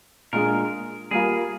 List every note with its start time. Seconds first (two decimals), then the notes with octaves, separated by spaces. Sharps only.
0.33 A#2 G#3 D4 G#4 A#4
1.11 G3 A#3 F4 G#4 A#4